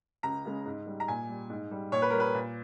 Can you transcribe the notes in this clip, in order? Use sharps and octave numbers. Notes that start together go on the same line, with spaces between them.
C#2 A#5
C#3 G#3
G#2
G3
A#5
A#2 G#5
G3
G#2
G3
A#2 C#5
B4
G3 A#4
B4
A#2